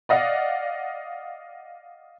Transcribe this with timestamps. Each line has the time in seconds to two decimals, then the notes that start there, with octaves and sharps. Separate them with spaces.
0.09 D5 D#5 F5 F#5